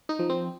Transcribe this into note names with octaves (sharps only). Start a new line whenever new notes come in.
D#4
F3
C4